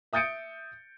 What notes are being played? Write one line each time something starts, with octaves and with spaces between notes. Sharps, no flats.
E5 D#6 G6 A6 C#7 D7